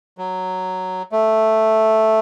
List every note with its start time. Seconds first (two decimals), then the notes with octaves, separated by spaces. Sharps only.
0.18 F#3
1.12 A3